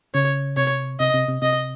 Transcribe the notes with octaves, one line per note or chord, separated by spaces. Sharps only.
C#3 C#5
C3 C#5
C3 D#5
C3
C3
C3 D#5